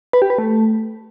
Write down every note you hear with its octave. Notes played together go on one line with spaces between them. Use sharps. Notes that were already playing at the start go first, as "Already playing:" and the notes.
B4
G4
B4
A3